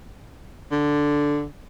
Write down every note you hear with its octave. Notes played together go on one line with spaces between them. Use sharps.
D3